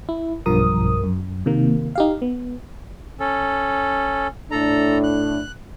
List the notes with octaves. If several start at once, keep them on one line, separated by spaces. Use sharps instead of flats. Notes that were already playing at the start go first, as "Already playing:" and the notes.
E4
B1 G2 F3 A#4 D#6
F#2
C3 D#3 A#3
D#4 G4 F5
B3
C#4 A4
A2 D4 A4 A#5
F#6